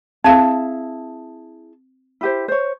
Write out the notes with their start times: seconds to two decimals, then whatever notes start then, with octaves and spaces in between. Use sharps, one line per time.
0.24 C4 E4 G#4 F5 A5
2.21 E4 G4 C5
2.48 C5 C#5